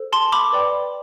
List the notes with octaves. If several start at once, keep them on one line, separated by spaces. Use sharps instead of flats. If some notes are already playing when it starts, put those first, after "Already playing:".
Already playing: A4 C5
A5 C6
B5 D6
B4 D5 G5